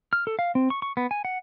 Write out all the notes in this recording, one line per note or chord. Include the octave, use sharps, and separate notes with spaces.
F6
A4
F5
C4
C#6
C#6
B3
G#5
F#5